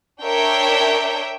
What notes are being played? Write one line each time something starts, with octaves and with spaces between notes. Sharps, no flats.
D4 A#4 C#5 E5 G5